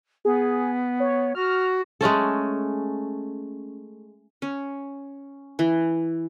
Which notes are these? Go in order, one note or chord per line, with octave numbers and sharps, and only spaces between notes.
B3 G#4
C#5
F#4 F6
G#3 A3 C#4 A4
C#4
E3